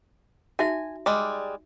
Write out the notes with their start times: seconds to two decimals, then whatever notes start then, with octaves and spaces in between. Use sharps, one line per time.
0.59 D#4 F#4 E5 G#5
1.06 G3 G#3 D5